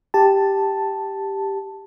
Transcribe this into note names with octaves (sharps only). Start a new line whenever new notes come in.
G4 A5